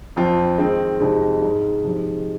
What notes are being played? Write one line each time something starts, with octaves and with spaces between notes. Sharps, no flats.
F2 F3 C4 F4
D#3 G#3 C4 D#4
F2 C3 G#3 D#4
G#2 G#3 D#4
C3 F3 G#3 D#4